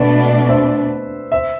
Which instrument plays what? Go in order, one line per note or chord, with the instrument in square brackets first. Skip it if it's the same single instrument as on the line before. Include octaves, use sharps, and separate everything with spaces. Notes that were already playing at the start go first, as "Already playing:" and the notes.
Already playing: [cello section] B2 A3 D4 [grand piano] B4 D5
[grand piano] C5 E5
C5 E5